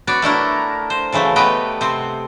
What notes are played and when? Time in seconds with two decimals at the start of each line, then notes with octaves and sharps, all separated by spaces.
0.07 B3 F#4 C#5 D5
0.22 A3 D4 E4 A#4
0.90 C5
1.12 C#3 E3 F#3 A3
1.36 A3 B3 G4 B4 D#5 G5
1.81 C3 C4